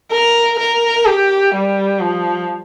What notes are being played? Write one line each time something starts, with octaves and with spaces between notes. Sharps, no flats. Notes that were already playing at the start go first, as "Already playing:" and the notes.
A#4
A#4
G4
G3
F3